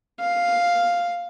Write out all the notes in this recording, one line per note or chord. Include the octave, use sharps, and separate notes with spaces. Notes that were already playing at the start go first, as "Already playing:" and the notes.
F5